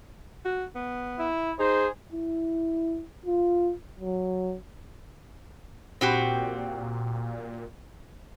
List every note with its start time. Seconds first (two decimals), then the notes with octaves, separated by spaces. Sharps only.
0.45 F#4
0.75 B3
1.19 E4
1.59 D#4 G#4 C5
2.13 E4
3.26 F4
4.00 F#3
6.01 A#2 C4 F#4 G4